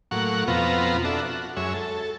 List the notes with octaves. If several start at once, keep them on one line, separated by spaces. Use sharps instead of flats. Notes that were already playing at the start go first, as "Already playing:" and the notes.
A2 F#3 A#3 F#5 C#6
F2 B2 B3 C4 F4 A#5
D4 F#4 A4 E5
F#4
F#2 G#3 C#5 E5
A4